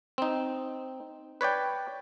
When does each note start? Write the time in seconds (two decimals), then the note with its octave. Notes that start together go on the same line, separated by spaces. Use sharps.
0.18 C4 D#4
1.41 B4 C#5 D5 G5